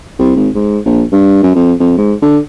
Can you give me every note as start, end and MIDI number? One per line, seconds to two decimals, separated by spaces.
0.19 0.31 36
0.36 0.49 32
0.55 0.78 44
0.85 1.03 34
1.12 1.41 43
1.43 1.54 42
1.55 1.73 41
1.80 1.94 41
1.98 2.13 44
2.22 2.38 50